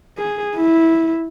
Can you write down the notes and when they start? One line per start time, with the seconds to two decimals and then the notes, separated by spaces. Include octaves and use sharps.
0.18 G#4
0.56 E4